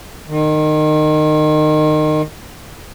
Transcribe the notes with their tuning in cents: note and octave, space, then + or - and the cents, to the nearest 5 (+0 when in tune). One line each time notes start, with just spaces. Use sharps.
D#3 -25